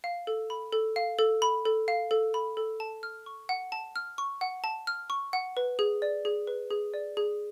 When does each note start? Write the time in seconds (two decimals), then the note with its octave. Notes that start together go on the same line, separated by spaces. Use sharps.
0.04 F5
0.27 A4
0.50 B5
0.73 A4
0.96 F5
1.19 A4
1.42 B5
1.65 A4
1.88 F5
2.11 A4
2.34 B5
2.57 A4
2.80 A5
3.03 F6
3.26 C#6
3.49 F#5
3.72 A5
3.96 F6
4.18 C#6
4.41 F#5
4.64 A5
4.87 F6
5.10 C#6
5.33 F#5
5.57 B4
5.79 G#4
6.02 D5
6.25 G#4
6.47 B4
6.70 G#4
6.94 D5
7.17 G#4